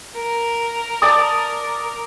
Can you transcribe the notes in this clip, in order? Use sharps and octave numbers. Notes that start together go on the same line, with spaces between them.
A#4
D5 A5 D#6